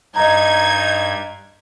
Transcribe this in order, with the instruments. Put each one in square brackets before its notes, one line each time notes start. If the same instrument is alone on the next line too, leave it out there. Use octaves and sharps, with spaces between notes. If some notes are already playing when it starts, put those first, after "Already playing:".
[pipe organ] G2 [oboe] D#4 [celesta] D#5 A#5 [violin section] G#6